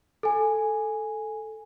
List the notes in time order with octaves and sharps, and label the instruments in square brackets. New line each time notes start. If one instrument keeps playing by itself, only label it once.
[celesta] A4 G#5